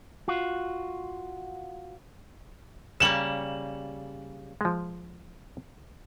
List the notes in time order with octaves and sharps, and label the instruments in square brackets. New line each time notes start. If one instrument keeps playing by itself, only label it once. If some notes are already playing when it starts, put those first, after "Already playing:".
[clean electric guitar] F4 F#4
[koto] C#3 G3 A#3 [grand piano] E7 F#7
[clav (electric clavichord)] F3 G#3